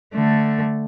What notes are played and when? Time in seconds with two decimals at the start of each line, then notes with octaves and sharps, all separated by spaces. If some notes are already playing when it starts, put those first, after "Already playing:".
0.15 D3 A3